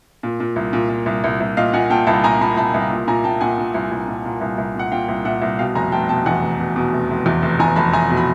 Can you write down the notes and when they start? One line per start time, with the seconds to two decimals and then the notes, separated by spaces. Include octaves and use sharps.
0.23 A#2
0.40 A#2
0.56 C2
0.73 A#2
0.89 A#2
1.06 C2
1.24 C2
1.40 C2
1.57 A#2 D#5 F5
1.73 A#2 F#5 G#5
1.90 A#2 G5 A5
2.07 C2 A5 B5
2.24 A#2 G#5 A#5
2.40 A#2 A5 B5
2.57 C2 A5 B5
2.74 C2
2.90 A#2
3.08 A#2 G#5 A#5
3.24 A#2 G5 A5
3.41 A#2 F#5 G#5
3.58 A#2
3.74 C2
3.92 C2
4.08 A#2
4.25 A#2
4.41 C2
4.58 C2
4.75 A#2 F#5
4.91 A#2 F5 G5
5.08 C2
5.25 A#2 E5 F#5
5.42 C2
5.59 B2 F5 G5
5.75 F1 G#5 A#5
5.92 F1 G5 A5
6.08 B2 G5 A5
6.26 E2 F#5 G#5
6.42 F1
6.59 B2
6.76 B2
6.92 F1
7.10 F1
7.26 E2
7.42 F1
7.59 E2 G#5 A#5
7.76 F1 A5 B5
7.93 F1 G#5 A#5
8.10 B2
8.17 B5